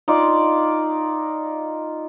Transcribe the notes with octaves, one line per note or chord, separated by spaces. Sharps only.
D#4 F4 D5